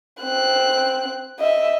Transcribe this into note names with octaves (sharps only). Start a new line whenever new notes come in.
C4 F#6
D#5 E5